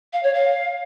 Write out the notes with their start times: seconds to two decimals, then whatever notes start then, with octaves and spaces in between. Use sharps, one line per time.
0.13 F5
0.23 C#5
0.34 F5